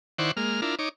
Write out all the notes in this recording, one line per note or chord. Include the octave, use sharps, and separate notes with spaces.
D#3 E4 C5 D5 F#5 C#6
G#3 A#3 F6
D4 E4 F4 A#4
D#4 C#5 D6